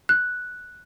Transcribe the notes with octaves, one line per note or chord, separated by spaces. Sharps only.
F#6